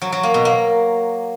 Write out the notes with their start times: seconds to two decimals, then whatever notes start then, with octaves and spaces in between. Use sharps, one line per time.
0.02 F#3
0.12 F#3
0.23 A#3
0.34 B2
0.45 A#3